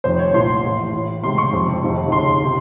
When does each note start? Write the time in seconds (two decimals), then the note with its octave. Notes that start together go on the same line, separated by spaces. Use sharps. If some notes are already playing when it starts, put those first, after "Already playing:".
0.04 F1 F2 D#3 C5
0.19 C#5
0.34 C2 A#2 C6
0.64 A1 A2
0.93 A1 A2
1.23 C#2 C3 D#3 C6
1.38 C#6
1.53 F#1 F2 C3
1.83 F1 D#2 D#3
2.12 D#2 C#3 C6
2.44 C3 D#3